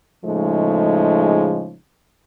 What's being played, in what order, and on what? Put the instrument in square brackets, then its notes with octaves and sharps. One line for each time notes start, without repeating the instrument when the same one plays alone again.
[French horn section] A2 C#3 F3 G#3 A3 D#4